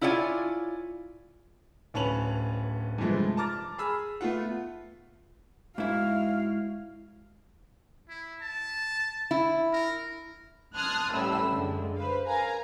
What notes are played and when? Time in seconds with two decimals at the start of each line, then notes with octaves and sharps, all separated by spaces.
0.01 E4 F4 C#5 D5 G5 G#5
1.94 D1 C#4 B4 A5 F7 F#7
2.98 G2 C3 E3 F3 G#3 A3
3.37 A5 A#5 D6 F6 A6
3.78 G#4 B5 E6 F6
4.21 A3 B3 F4 F#5
5.78 G#2 E4 F#4 F5
8.09 E4
8.42 A5
9.31 E4
9.73 A#4
10.76 A5 C6 D#6 F6 F#6 G#6
11.13 A1 A2 G3 B5 E6
11.52 F#2 D3 G#3
11.96 B4 C5 F5
12.27 A#4 F5 G#5 A#5